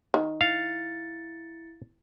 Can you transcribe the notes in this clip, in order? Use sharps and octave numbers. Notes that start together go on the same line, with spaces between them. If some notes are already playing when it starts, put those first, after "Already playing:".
D#3
E4 F5 A6 C#7